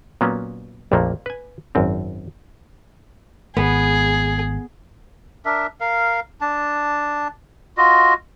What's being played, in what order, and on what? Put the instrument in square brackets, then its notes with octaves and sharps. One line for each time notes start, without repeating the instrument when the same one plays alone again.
[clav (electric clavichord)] A#2 F#3 A#3 B3 C#4
A#1 F2 A#2 A3 A#3
B4 G#5
G#1 F#2 C4
[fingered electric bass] G#1 [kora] B3 [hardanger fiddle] G#4
[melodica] D4 A#4 E5
A#4 F5
D4 A5
F4 F#4 D#5